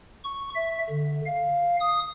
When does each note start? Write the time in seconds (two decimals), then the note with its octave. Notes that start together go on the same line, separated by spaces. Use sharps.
0.24 C#6
0.55 E5
0.90 D3
1.26 F5
1.81 D#6